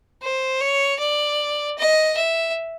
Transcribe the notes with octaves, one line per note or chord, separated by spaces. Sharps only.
C5
C#5
D5
D#5
E5